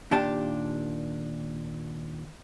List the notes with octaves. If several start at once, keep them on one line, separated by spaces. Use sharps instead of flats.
D#2 A#2 D4 G4 A5